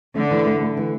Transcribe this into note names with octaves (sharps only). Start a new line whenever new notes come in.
D3 A3
E3
A3
A3
E3